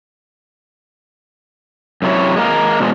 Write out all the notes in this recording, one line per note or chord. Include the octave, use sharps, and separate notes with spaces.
F#2 C3 F#3 E4 C#5
G#3 A#3 A#4
B2 F3 G3 G#3